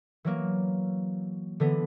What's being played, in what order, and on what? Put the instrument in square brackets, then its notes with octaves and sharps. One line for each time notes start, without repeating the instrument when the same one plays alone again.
[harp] E3 F#3 A#3
D3 E3 B3